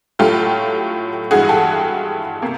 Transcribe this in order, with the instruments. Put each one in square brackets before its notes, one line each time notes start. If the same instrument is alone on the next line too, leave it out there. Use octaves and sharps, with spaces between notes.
[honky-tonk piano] A2 F#3 A3 F4 G4
G2 E3 G#3 F#4 G#4
G4 A4
C3 A#3